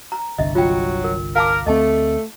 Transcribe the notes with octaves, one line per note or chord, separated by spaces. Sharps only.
A#5
G1 C2 D3 D#5 E5
F#3 F4 G5
A#4
A#4 F5 A5 D6
D2 A3 C4 D#5 A5